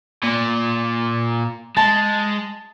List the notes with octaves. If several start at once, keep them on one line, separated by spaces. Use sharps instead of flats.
A#2
G#3 A5